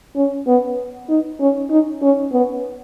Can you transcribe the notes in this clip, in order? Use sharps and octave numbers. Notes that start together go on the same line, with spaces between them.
C#4
B3
D#4
C#4
D#4
C#4
B3